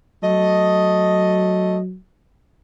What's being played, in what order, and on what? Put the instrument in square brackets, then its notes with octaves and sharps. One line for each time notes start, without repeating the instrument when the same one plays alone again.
[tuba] F#3 [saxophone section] A3 D#5